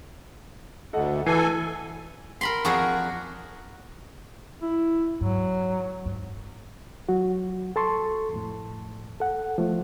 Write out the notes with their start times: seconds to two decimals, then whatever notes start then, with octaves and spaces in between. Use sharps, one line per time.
0.93 D2 A4 D#5 F#5
1.26 E3 A4 G#5 C7
2.41 A#4 B5 C6
2.65 F2 F#4 G#4 A#4 D5
4.62 E4
5.21 G#2 F#3
6.06 G#2
7.09 F#3 F#4
7.76 A4 A5 C6 C#6
8.33 F2 A2
9.20 A4 F#5
9.58 F3 A3 F4